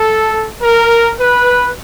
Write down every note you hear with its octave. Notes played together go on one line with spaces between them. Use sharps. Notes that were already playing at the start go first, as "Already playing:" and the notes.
Already playing: A4
A#4
B4